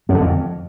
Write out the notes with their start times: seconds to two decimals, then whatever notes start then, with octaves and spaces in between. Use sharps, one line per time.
0.09 F#2
0.15 D3
0.21 F2